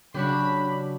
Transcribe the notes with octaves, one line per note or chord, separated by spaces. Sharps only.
C#3 F#3 C#4 D4 F#4 G4 B5